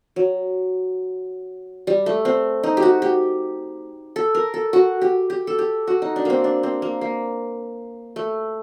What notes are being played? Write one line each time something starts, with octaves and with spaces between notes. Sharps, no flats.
F#3
G3
A3
C4
D#4
G4
F#4
G4
A4
A#4
A4
F#4
G4
G4
A4
G4
F#4
D#4
D4
A#3 C4
D4
C4
A#3
A#3
A3